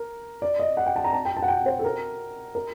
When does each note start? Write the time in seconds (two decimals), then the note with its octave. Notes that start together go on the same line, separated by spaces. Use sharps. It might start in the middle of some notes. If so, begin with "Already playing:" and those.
Already playing: A#4
0.42 D5
0.60 D#5
0.77 F#5
0.86 G5
0.96 A5
1.04 A#5
1.13 A5
1.25 G5
1.37 A5
1.42 F#5
1.48 G5
1.66 C5
1.79 A4
1.85 A#4
2.55 A#4